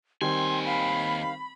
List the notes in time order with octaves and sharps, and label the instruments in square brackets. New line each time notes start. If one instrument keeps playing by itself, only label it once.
[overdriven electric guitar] D#2 G#5 [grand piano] D#3 G3 C4 [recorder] C6
[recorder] F5 [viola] B5